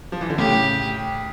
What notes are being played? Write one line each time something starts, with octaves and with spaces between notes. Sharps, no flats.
F3
E3
D3
A2 C#3 G4